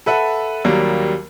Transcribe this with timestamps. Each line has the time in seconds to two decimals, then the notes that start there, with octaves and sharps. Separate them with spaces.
0.06 A4 B4 E5 F#5
0.65 D#2 F#3 G3 A#3